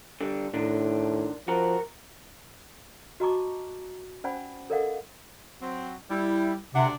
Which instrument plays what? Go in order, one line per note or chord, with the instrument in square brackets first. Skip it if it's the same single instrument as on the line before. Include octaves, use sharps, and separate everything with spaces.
[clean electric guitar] D3 G3
[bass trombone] A2 [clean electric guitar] D#3 D4
[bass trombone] F3 [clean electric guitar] F#4 A#4
[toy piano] F#4 D#5 A5 A#5 C#6 D6
C#4 C5 D5 F#5 G#5 B5
A4 A#4 D5 D#5 F5 F#5
[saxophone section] F#3 C4
[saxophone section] G3 [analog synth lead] E4
[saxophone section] D2 D4 [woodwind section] C3 [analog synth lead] F#5